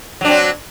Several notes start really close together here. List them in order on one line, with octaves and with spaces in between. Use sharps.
F#3 D4 C4